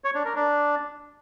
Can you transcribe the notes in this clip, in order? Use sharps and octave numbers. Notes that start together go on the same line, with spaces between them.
C#5
D4
A#4
D4